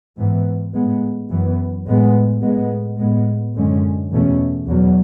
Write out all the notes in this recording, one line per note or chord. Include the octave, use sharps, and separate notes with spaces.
G#2 E3 B3
A2 G#3 B3
F#2 E3 B3
A2 G#3 B3
A2 G#3 B3
A2 G#3 B3
F#2 D3 G#3 C#4
E2 B2 A3 C#4
E2 B2 F#3